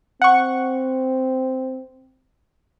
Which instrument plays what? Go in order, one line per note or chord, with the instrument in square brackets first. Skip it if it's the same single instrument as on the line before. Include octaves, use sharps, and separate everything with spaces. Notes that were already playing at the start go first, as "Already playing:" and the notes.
[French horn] C4 [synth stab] F#5 C#6